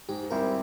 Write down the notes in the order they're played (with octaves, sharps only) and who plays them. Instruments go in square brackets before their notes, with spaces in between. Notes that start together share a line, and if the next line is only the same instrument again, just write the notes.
[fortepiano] G#2 [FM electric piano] G4
[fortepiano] G3 C4 E4 G4 [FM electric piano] A#4